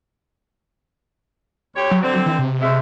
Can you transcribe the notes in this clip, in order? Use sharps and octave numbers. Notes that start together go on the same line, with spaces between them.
D2 G4 C#5
F#3
D3 C4
E3
C3
D2 G#3 E5